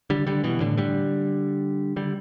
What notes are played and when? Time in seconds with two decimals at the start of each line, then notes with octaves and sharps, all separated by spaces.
0.10 D3 G3
0.27 D3 G3
0.44 B2 E3
0.60 A2 D3
0.77 D3 G3
1.96 D3 G3